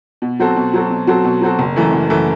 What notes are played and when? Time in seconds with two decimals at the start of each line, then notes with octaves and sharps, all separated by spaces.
0.22 B2
0.39 F#3 C4 F#4 A4
0.56 B2
0.74 F#3 C4 F#4 A4
0.90 B2
1.07 F#3 C4 F#4 A4
1.24 B2
1.41 F#3 C4 F#4 A4
1.59 F#1
1.76 F#2 E3 A3 E4
1.93 F#1
2.10 F#2 E3 A3 E4